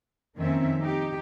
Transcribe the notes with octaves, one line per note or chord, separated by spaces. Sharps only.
F2 D#3 A#3 C4 C#4 E5
D#4 G4